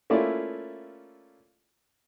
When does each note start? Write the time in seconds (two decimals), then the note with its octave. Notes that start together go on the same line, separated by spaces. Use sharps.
0.10 A3 A#3 C#4 E4 F4 D5